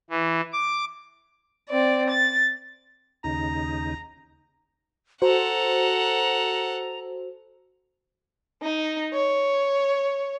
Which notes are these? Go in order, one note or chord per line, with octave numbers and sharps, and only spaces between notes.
E3
D6
C4 D5
A6
D#2 C#3 D#4 A#5
F#4 A4 C5 F#5 A#5
D#4
C#5